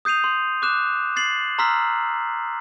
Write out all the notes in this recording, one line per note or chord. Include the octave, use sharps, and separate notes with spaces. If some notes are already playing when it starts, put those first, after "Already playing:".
D#6 G6 C7 D#7 F7
C6
D6 F#6 E7
A6 C7 F#7
A#5 C6 E6 F6 B6